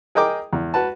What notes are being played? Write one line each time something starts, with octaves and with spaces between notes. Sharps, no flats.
G#4 A#4 D#5 G5 D6
E2
F#4 B4 A5